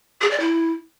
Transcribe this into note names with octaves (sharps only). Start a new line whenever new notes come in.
G#4
D5
E4